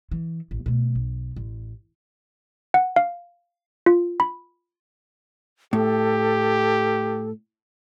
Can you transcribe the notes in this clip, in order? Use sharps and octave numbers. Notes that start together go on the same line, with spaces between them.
E3
A1
B2 A3
B1
A1
F#5
F5
F4
B5
A2 G4 A4